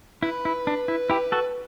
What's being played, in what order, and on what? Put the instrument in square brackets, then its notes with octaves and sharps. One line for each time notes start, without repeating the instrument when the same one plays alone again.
[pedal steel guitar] E4 [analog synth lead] B4
[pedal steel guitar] E4
D4
E4
E4 G4
F#4 A4